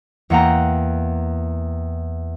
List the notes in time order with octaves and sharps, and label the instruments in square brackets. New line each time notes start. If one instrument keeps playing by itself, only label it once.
[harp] E2 A#3 F#5 G5 A#5